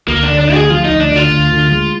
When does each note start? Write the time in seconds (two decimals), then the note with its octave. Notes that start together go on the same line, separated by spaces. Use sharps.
0.08 D2 A#3
0.23 D4
0.28 D3
0.38 D4
0.49 D2
0.54 G#4
0.70 F3 F4
0.85 D#4
0.90 D2
1.00 D4
1.11 D3
1.16 F4
1.31 D2
1.52 D3
1.72 G#3